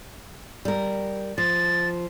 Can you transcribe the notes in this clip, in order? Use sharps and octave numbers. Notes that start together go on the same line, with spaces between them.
G3 A#4
F3 A6